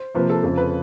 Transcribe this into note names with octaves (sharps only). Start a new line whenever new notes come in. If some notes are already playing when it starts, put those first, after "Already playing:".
Already playing: C5
C3 F3 A#3 B4
A4
F2 C#3 F3 A4
B4